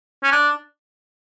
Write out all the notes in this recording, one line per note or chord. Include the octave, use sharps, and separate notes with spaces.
C#4
D4